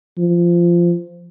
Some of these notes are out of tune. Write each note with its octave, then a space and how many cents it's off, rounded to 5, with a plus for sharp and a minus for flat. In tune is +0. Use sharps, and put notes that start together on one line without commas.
F3 -15